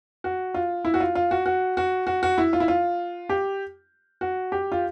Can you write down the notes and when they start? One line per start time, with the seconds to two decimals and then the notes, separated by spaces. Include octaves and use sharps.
0.24 F#4
0.54 F4
0.85 E4
0.94 F#4
1.00 F4
1.15 F4
1.31 F#4
1.46 F#4
1.77 F#4
2.07 F#4
2.23 F#4
2.38 E4
2.53 F4
2.60 E4
2.68 F4
3.29 G4
4.21 F#4
4.52 G4
4.72 F4